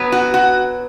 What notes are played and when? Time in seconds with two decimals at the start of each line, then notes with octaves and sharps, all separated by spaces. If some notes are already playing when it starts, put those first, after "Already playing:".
Already playing: F#3 B3
0.12 F#4
0.34 F#4